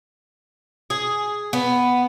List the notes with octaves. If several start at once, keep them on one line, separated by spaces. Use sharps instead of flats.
G#4
B3